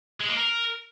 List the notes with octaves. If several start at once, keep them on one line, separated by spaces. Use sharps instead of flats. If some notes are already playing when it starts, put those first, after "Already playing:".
G#3
A#3
A#4